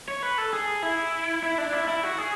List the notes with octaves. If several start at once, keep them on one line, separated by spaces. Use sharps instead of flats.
C#5
B4
A4
G#4
E4
E4
D4
E4
E4
F#4
G#4